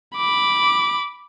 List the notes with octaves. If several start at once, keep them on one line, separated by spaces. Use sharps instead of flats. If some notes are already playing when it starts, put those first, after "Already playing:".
B5 D6